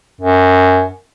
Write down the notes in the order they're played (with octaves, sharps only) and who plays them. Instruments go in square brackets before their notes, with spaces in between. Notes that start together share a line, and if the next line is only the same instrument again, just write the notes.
[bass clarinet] F#2